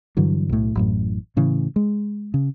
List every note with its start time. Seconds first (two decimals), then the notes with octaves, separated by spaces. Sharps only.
0.17 G2 D3 E3 F#3
0.49 B1 A2
0.75 A1 F#2 A2
1.37 A2 C#3 E3
1.76 G#3
2.34 C#3